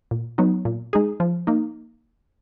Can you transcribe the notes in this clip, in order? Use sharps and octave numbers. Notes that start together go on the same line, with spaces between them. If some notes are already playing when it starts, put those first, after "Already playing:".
A#2
F#3 B3 D#4
A#2
G#3 D#4 G#4
F3
A#3 D#4